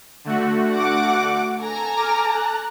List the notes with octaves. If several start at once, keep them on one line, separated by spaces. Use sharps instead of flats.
D3 A3 F#4
F#5 D6
A4 G#5 A#5
D6 F6
F#6